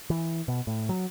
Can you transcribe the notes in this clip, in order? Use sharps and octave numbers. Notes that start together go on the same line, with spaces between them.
E3
B2
A2
F#3